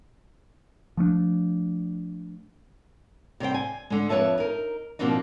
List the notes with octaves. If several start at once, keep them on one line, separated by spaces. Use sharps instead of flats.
F3 A3 C#4 D4
C3 G3 C5 G5
G#5
D3 G#3
F2 B4 C#5 E5 A5
D#4 A#4
B2 F3 A#3 C4 D4 D#4